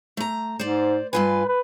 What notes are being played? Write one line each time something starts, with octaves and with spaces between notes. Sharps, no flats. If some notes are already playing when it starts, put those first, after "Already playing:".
A3 A#5
G#2 C5 D5
G2 F4 B4 G#5
B4